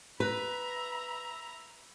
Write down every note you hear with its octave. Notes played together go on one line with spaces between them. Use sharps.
B4 E5 A#5 B5